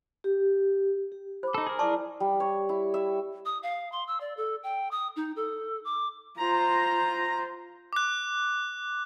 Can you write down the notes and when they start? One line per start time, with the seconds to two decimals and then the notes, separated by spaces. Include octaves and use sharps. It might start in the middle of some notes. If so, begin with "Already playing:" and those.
0.24 G4
1.12 G4
1.43 C5 B5 D6
1.54 D#4 A4
1.67 G#4 A#4
1.79 E4 D5 A5 C#6 D6
2.20 G3
2.40 C#5
2.69 E4
2.94 E5
3.46 D#6
3.63 F5
3.92 C6
4.08 E6
4.21 D5
4.37 A4
4.63 G5
4.91 D#6
5.16 D#4
5.36 A4
5.85 D6
6.39 F4 C5 A#5
7.93 D6 F#6